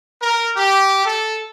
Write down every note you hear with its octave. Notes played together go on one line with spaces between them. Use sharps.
A#4
G4
A4